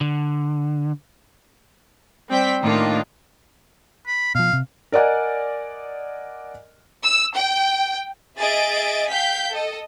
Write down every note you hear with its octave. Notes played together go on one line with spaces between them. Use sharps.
D3
G3 C4 G5 B6
A2 D#3 A#3 D4 D#4 F4
B5
B2 F3 F5
C3
A#4 D5 D#5 F#5 G#5
E6
G5
G#4 D#5 E5 A6 D7
F5 G5 G6 B6
A4 D#5